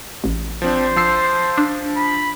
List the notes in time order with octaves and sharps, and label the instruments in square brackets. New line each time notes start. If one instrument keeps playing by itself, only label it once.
[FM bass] A1
[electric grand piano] F3 C4 D4 [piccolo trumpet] C5
[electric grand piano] F3 E6 C7
[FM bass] D4
[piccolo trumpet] B5